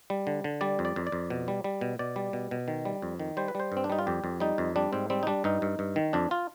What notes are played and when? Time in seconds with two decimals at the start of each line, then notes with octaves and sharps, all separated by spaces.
0.10 G3
0.27 D3
0.44 D3
0.61 G3 D5
0.79 F2
0.85 D5
0.96 F2
1.07 D5
1.12 F2
1.30 B2
1.48 G3
1.64 G3
1.81 B2
1.99 B2 D5
2.16 G3
2.33 B2
2.51 B2
2.68 D#3
2.85 G3
3.02 F2
3.19 D#3
3.37 G3 C5
3.48 B4
3.55 G3 C5
3.72 G2
3.77 C4
3.84 D4
3.90 G3 D#4
3.99 F4
4.07 F2 G4
4.24 F2
4.40 G3 D#4
4.58 F2
4.76 G3 D4
4.93 G#2 C4
5.10 G3 C4
5.23 D#4
5.27 G3 D4
5.44 G2 D#4
5.62 G2
5.79 G2
5.96 D#3
6.13 F2 D4
6.31 F4